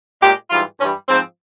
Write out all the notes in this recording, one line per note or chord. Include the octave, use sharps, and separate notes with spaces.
A#2 G#3 G4
G#2 E3 G3 F4
G2 E3 G3 C#4
G#2 F3 G#3 C4